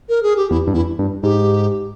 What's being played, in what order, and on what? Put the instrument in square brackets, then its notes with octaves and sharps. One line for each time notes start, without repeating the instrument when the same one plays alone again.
[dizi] A#4
G#4
G4
[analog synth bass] E2 [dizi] E4
[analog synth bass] G2
[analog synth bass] E2 [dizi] E4
[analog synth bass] G2
[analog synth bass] G#2 [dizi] G4